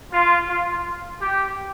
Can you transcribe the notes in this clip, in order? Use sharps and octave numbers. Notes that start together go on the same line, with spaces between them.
F4
F4
G4